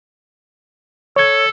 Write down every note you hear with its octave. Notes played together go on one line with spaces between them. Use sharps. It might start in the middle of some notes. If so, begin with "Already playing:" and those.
A4 C#5 G#6